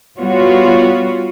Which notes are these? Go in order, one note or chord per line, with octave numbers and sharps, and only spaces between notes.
G3 B3 F4 F#4 C#5